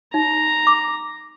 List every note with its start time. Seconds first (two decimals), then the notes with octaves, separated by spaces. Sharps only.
0.14 D#4 A#5
0.67 D6